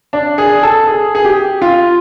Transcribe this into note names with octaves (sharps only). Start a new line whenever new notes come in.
D4
G#4
A4
G#4
G#4
G4
F4